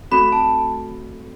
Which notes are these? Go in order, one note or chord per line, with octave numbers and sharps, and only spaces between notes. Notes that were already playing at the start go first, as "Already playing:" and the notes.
A3 C4 F#4 A4 B5
A5